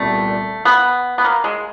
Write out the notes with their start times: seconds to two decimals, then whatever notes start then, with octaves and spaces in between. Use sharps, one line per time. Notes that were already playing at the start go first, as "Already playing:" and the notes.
Already playing: C2 A#2 G3 A3 B3
0.65 B3
1.18 B3
1.24 A#3
1.44 G#3